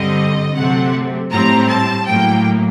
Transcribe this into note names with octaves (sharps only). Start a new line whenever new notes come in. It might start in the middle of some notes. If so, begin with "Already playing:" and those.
Already playing: G2 D3 G3 C4 D#5
C3 F#3 A3 C4 F#5
A2 G3 C4 A#5
A5
A2 F#3 A#3 G5